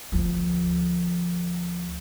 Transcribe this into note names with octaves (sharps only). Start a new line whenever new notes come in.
D2 F3